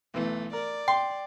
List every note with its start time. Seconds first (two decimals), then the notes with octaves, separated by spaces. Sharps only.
0.14 B1 E3 A3
0.53 A#4 D5
0.88 G5 C6